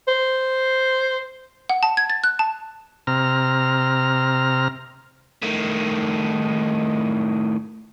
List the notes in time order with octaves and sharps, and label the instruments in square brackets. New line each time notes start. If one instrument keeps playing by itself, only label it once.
[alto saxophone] C5
[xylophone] F#5
A5
G#6
A6
F#6
A5
[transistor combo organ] C3 A#5 F6
[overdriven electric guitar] A2 D#3